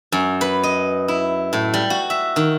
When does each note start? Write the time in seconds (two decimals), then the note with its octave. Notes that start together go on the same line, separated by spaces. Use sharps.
0.12 F#2
0.41 B4
0.63 D#5
1.08 E4
1.53 A2
1.74 G3
1.90 F#4
2.10 E5
2.36 D#3